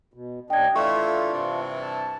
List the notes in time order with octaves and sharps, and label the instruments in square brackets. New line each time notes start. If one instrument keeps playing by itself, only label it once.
[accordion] B2
[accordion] D#2 D4 D#5 [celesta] G5 G#6
[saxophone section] A2 E3 A3 [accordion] D4 F4 [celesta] C#6
[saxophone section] G2 C3 E3
[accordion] A5